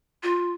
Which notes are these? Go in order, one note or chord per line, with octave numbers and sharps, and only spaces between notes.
F4